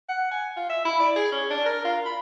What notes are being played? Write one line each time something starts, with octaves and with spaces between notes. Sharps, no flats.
F#5
G#5
F4
E5
E4
D5
G#4
C#4
D4
A#4
F4
B5